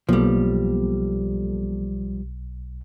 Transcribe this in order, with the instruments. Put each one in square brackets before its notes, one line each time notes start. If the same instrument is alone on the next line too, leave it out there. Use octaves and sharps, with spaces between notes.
[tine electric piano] B1 [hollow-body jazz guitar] F3 G3 [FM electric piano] A#3 B3 A4